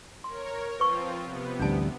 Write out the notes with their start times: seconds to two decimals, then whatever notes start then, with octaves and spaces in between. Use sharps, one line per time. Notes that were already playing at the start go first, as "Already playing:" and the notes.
0.24 A#4 C#5 C6
0.80 F3 C4 F4 B4 C#6
1.22 C3 B3
1.59 A1 D2 G3 D4 A5